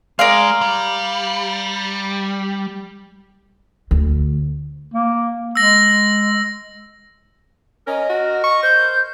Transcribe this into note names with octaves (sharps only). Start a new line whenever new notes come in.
G#3 A#4 D5 F5
G3
D2
A#3
G#3 E6 A#6
C#4 A#4 D#5
F#4
C#6
C5 G6